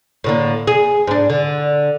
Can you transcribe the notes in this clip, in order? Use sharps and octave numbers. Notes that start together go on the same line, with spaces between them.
A2 D3 A#3
G#4
G#2 D4
D3